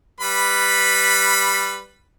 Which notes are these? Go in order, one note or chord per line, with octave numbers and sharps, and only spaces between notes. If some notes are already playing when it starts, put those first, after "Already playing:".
G3 B4 B5